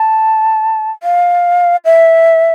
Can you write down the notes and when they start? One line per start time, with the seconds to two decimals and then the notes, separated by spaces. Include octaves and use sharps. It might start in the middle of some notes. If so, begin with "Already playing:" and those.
Already playing: A5
1.03 F5
1.85 E5